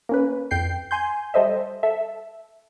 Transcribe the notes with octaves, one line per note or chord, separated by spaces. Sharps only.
A#3 C#4 B4
F2 G5 G6 C7
G#5 C6 G6
G3 A4 C5 D#5 E5
A4 E5